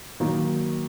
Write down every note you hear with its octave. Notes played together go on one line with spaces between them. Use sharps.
D#3 F#3 A#3 D#4